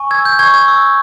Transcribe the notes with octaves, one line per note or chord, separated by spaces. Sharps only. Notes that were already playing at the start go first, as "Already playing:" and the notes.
Already playing: G#5 C#6
E6 G#6
G6
C#6 G#6
G#6
E6